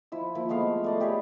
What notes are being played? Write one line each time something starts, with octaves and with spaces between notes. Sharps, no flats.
F3 E4 E6
F3 A#3 E4
G#3 A3 B3 F5
A3 D5 D#5
G4 G#4 B4 C#5